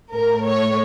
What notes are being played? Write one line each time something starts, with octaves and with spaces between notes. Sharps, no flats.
A2 A3 A#4
C#5